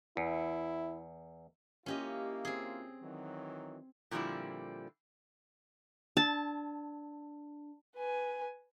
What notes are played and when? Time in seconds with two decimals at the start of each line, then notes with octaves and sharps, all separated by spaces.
0.17 E2 E4
1.86 A#3 C#4 E4 F4 G4 D#5
2.45 C4 G#4
3.02 D#3 E3 F#3
4.11 A#2 D3 F3 G3 C4 E4
6.17 D4 A5
7.96 B4 G#5